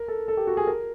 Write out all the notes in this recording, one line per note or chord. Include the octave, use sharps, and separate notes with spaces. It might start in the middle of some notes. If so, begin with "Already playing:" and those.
Already playing: A#4
A4
A4
G4
F#4
G#4
A#4